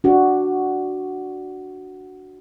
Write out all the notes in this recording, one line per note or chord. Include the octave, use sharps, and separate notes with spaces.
D4 F#4